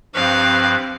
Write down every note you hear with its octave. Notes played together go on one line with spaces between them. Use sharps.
G2 F3 C4 G4 B4 F5 C#6 F#6